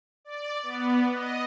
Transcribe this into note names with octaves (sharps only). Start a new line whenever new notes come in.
D5
B3
D#5